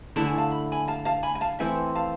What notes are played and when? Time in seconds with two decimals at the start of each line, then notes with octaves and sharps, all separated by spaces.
0.16 D3 A3 E4 A5
0.26 G#5
0.38 F5 A5
0.51 B5
0.72 G#5 B5
0.88 F5 A5
1.05 F5 A5
1.23 G#5 B5
1.35 G#5
1.41 F5 A5
1.59 E3 A3 C4 E4 E5 G#5
1.95 F5 A5